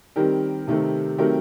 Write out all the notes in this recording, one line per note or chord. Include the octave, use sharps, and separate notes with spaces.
D#3 G3 C4 G4 A#4
C3 D#3 A3 C4
D#3 F#3 A3 C4 G4 A#4